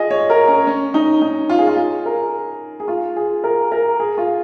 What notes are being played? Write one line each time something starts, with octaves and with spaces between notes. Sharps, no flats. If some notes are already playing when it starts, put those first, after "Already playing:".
Already playing: F4 G#4 D#5
C#5
A#4
C#4
C#4
D#4
D#4
F4
G#4
F4
G#4
A#4
G#4
F4
G#4
A#4
A#4
G#4
F4